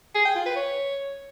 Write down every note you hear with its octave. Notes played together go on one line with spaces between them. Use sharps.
G#4
G5
F4
B4
C#5